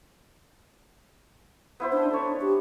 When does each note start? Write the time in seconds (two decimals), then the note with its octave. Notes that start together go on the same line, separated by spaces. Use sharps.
1.80 B3 E4 C5
1.93 D4
2.11 D4 A4 C#5
2.41 G4